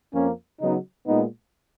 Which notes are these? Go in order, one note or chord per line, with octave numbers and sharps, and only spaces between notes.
F2 F3 A#3 C#4
C#3 F#3 B3 D#4
A#2 G#3 B3 D#4